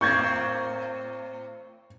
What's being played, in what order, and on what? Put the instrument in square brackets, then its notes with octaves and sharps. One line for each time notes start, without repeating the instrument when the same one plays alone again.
[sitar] A2 A#3 C4 [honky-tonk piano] C#6 G6 G#6